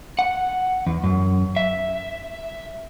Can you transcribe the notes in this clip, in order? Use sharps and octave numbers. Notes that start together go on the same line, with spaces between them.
F#5
E2
F#2
E5